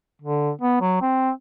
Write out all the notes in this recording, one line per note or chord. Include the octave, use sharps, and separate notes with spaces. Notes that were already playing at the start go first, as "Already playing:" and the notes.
D3
B3
F#3
C4